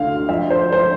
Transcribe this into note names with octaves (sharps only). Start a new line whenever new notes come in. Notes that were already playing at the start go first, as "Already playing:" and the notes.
Already playing: D2 D3 F5
F3 E5
C5
F3 C5